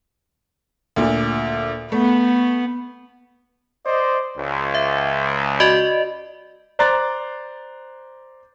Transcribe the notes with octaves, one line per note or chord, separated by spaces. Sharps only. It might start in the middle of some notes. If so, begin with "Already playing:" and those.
D2 A#2
A3 B3
C5 D5 D#5
C#2
E5
F#4 D5 D#5
C5 D5 A#5 C6 F#6 A6